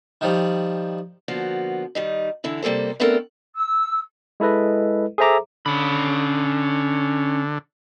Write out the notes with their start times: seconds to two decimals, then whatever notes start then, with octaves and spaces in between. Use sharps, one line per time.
0.21 D#3 F3 G3
1.28 D3 F3 A#3 B3 F#4
1.95 D#3 G3 D#4
2.44 D3 E3 E4
2.62 C3 G3 A#3 A4 C5
3.00 A3 B3 C4 D4 A4 A#4
3.55 E6
4.40 G#3 E4 A4 B4 D#5
5.18 G#4 A4 C5 E5 A#5 D6
5.66 D3 C#4 B5